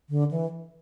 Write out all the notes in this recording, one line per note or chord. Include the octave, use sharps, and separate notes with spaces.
D3
E3